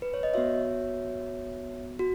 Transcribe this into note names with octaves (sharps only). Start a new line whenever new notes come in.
B4
C#5
D#5
B3 F#4 C#5 E5
F#4